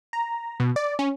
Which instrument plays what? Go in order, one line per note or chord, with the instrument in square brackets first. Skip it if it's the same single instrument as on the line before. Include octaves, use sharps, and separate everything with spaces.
[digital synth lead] A#5
B2
D5
C#4